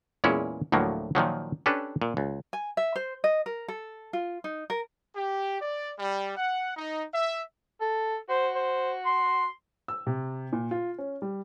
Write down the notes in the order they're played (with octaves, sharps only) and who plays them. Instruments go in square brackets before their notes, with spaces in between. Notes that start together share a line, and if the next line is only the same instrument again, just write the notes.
[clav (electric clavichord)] E2 A#2 G#3 C#4 E4
D2 A2 F3 F#3 A#3
A#2 D#3 F3 F#3
C#4 D4 G4 A4 B4
A#2
C#2
[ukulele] G#5
E5
C5
D#5
A#4
A4
F4
D#4
A#4
[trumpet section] G4
D5
G3
F#5
D#4
E5
[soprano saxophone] A4
[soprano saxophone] F#4 [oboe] C5
[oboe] C5
C6
[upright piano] E6
C3
A#2
F4
C#4
G3